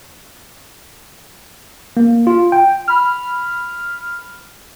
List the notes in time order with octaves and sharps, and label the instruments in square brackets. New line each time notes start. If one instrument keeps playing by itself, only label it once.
[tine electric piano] A#3
F4
G5
[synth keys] B5 F6